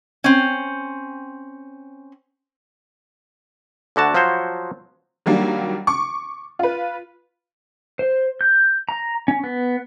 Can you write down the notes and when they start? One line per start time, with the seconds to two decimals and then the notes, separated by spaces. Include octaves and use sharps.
0.24 C4 C#4
3.96 D2 D3 F#4 A5
4.14 F3 F#3 F#4 C5 C#5
5.26 D#3 F#3 G3 A#3 D4
5.87 C#6 D6
6.59 F4 B4
7.99 C5
8.41 G6
8.89 A#5
9.28 C#4
9.44 B3